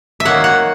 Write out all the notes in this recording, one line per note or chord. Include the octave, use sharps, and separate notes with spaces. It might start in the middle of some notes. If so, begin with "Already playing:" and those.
E5
D#3 F#3 A#3 F#5
F#5